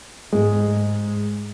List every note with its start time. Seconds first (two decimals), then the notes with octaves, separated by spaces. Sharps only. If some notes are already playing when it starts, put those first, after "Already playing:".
0.31 G#2 G#3